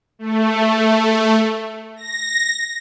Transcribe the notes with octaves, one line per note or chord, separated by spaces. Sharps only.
A3
A#6